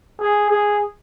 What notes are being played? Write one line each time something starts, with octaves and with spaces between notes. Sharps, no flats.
G#4
G#4